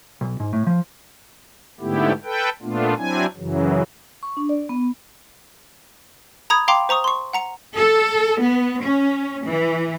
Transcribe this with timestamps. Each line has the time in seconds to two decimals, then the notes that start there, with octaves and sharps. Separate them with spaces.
0.21 B1
0.40 G#2
0.53 A2
0.67 F3
1.80 G#2 D3 A3 B3 E4 G4
2.24 A4 B4 G5
2.62 A#2 A3 B3 D4 F4
2.97 F#3 C4 D4 E4 G#5
3.37 F#2 C#3 E3 F#3
4.23 C#6
4.37 D4
4.49 D5
4.69 B3
6.50 A#5 B5 D#6 G#6
6.68 F5 G5 A#5 C6 D6
6.89 C5 A#5 C#6 D#6
7.04 C6 C#6
7.33 F#5 A#5 C#7
7.77 A4
8.41 B3
8.81 C#4
9.46 E3